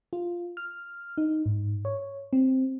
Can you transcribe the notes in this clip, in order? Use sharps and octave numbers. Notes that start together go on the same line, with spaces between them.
F4
F6
D#4
G#2
C#5
C4